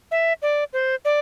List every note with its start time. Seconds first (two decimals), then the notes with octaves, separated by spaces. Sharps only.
0.11 E5
0.42 D5
0.73 C5
1.05 D5